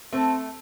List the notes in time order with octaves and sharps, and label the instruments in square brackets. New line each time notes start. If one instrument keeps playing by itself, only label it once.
[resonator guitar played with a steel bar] A3 [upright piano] C4